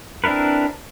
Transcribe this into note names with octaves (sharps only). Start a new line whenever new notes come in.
C4 D4 E4 A#4 B4